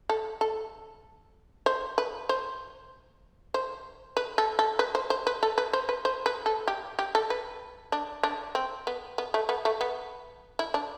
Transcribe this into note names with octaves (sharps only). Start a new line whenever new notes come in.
A4
A4
C5
B4
C5
C5
B4
A4
A4
B4
C5
C5
B4
A4
B4
C5
B4
C5
B4
A4
G4
G4
A4
B4
D4
D4
C4
B3
B3
A3
B3
A3
B3
E4
D4